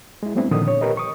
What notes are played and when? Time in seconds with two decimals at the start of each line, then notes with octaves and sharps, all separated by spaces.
0.23 G#3 E4
0.35 G3 A3 B3 C4 D4 E4
0.51 A#2 D3 D#3 F3 D#6
0.67 C#5
0.81 G4 A#4 B4 D#5
0.97 C#6 D#6